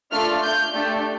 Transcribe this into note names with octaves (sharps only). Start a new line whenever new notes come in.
A3 D4 F4 A4 F6
G6
A3 D4 G4